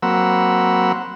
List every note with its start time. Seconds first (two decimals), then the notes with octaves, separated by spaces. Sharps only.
0.02 F#3 A#3 C4 F#5 B5 E6